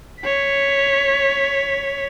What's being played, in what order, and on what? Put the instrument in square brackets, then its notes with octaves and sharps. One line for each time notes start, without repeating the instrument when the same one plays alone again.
[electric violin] C#5 B6